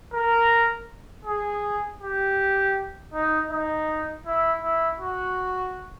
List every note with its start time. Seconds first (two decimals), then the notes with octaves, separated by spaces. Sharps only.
0.13 A#4
1.25 G#4
2.01 G4
3.13 D#4
3.51 D#4
4.26 E4
4.63 E4
5.00 F#4